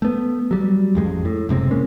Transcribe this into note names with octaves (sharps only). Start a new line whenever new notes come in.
A3 B3
F#3 G3
A1 F2 G#3
A2
F#1 C3 G#3 C4
G#3 A#3 C#4